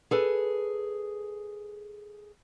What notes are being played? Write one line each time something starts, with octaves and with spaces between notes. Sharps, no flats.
G#4 A4 B4